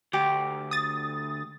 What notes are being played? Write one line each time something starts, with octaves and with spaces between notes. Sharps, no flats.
D2 G4
D#6 A6